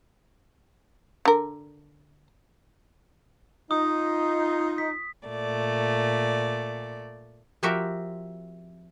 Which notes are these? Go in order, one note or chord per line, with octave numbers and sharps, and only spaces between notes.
D3 A#4
D#4 F4 D#6
B6
A#2 A3 D5
F3 C4 F#4 G4 A#4 E5